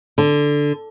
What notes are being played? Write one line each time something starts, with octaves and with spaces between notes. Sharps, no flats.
D3